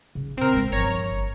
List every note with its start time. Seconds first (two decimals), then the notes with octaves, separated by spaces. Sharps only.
0.15 C#3
0.37 A#2 C4 A#4
0.53 G#3 B3
0.72 G1 F3 C#5 A#5